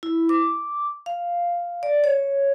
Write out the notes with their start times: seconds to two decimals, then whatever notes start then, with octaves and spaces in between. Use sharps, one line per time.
0.03 E4
0.29 D6
1.06 F5
1.83 D5
2.04 C#5